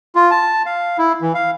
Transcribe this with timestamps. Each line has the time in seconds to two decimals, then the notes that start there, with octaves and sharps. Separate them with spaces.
0.15 F4
0.31 A5
0.66 F5
0.98 E4
1.22 E3
1.35 F5